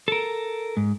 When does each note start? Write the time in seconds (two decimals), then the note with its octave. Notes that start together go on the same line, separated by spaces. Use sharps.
0.08 A4 A#4
0.77 G#2